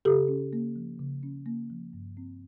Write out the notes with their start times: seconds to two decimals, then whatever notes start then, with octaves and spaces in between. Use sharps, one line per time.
0.05 C#3 G4 A4
0.28 C#4
0.53 A#3
0.76 F3
0.99 C#3
1.23 C#4
1.46 A#3
1.70 F3
1.93 G2
2.17 C4